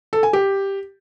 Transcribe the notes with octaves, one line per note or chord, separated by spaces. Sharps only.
A4
G#5
G4